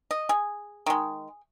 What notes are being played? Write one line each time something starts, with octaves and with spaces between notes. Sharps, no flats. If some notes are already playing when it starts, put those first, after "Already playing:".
D#5
G#4
D#3 G#3